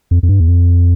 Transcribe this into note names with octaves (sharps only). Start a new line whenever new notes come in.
F2
F2
G2
E2
F2